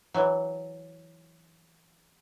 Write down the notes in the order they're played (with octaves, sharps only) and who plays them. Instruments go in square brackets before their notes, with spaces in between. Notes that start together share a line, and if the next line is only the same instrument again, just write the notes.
[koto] E3 F#3